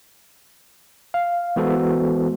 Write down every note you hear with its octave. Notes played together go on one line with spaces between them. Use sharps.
F5
E3 G#3 B3 F#4 A4 C5